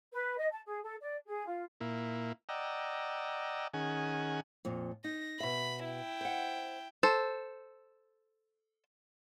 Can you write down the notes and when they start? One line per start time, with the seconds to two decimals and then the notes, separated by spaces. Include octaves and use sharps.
0.13 B4
0.38 D#5
0.51 A5
0.66 G#4
0.83 A4
1.01 D5
1.27 G#4
1.47 F4
1.81 A#2 A#3 E4
2.49 D5 D#5 F#5 G5 A#5 E6
3.74 D#3 C#4 G#4 F#5 G#5
4.65 F2 A#2
5.04 D#4 A#6
5.40 B2 E5 B5
5.85 E4 G5
6.21 C5 F#5
7.03 A4 C5